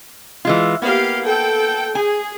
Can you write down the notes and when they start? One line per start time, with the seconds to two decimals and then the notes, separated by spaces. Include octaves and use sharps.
0.45 E3 G#3 F4
0.82 A#3 B3 G4 F5
1.23 A4 G5
1.95 G#4 G#5